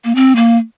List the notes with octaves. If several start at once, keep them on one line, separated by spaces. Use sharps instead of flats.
A#3
C4
A#3